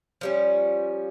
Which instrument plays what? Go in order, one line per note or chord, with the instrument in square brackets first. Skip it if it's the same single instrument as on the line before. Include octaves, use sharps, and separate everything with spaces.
[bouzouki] F3 G3 C#4